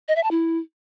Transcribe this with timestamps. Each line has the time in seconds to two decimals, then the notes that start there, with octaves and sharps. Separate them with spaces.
0.08 D#5
0.16 E5
0.23 A5
0.31 E4